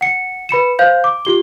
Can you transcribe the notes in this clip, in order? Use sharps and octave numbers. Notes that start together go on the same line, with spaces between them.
F#5 C#7
B4 B5 C#7 E7
C5 F5 G6
D6
F4 G4 G7